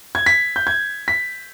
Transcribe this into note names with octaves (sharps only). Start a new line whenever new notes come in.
G#6
B6
G6
G#6
B6